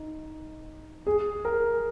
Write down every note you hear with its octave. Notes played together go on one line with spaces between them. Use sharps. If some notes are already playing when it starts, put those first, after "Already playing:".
Already playing: D#4
G#4
A#4